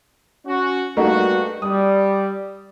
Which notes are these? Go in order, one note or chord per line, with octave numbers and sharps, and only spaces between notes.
C#4 F#4
G2 A3 A#3 D#4 F#4
G3 D#6